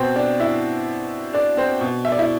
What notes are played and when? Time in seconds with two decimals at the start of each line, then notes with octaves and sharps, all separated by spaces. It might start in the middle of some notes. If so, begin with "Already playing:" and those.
Already playing: B2 C4 C5
0.16 D4 D5
0.40 E4 E5
1.33 D4 D5
1.57 C4 C5
1.81 B2
2.05 E5
2.12 D5
2.19 E4 E5